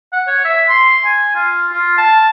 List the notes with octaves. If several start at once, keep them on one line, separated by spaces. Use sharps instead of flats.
F#5
C#5
E5
C6
G#5
F4
F4
A5